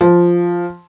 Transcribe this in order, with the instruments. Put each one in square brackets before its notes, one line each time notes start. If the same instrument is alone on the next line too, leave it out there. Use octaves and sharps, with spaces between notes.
[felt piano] F3